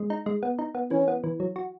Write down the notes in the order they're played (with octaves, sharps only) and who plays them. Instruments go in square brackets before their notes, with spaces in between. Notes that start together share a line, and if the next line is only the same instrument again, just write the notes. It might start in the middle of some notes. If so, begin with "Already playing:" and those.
Already playing: [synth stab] G#3
D#4
G#3
B3
D#4
B3
[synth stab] E3 [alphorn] C#4
[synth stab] B3
E3
F#3
F#4